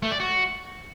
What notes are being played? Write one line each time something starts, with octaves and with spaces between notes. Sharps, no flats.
A3
D5
F#4